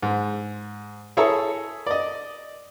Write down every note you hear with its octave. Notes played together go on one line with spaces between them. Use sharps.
G#2
E4 G#4 A4 C#5 E5 A#5
D5 D#5